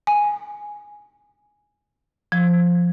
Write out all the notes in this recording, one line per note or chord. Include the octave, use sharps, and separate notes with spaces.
G#5
F3